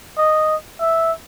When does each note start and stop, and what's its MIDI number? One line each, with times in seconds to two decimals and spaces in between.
0.17 0.56 75
0.80 1.12 76